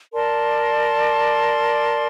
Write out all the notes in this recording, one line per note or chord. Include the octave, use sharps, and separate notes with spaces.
A#4 D5 A5 C6